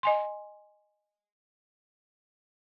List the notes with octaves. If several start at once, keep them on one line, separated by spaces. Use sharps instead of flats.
D#5 G#5 C6